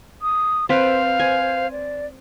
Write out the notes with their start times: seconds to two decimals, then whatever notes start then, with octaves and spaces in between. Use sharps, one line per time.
0.22 D#6
0.69 C4 B4 C5 F5
1.20 G#5
1.71 D5